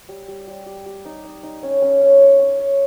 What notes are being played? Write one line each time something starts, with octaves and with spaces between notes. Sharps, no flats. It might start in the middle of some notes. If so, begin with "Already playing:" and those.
G3
G3
G3
G4
G4
D#4
D#4
D#4
C#4
C#4
C#4
C#5
C#4
C#5